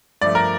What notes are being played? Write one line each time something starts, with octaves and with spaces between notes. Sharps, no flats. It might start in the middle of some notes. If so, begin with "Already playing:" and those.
G2 F3 A3 D5
A#4